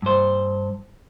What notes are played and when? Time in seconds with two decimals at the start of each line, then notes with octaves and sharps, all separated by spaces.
0.02 G2 C5